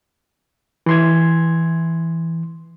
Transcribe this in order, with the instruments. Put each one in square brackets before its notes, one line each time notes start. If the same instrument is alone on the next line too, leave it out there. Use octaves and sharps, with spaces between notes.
[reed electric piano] E3 C6 G#6